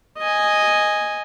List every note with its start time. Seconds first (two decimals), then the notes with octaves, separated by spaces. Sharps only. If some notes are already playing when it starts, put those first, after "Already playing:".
0.19 D#5 G#5